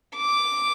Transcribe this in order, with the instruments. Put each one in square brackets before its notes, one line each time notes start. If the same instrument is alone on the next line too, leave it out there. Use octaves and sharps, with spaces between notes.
[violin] D6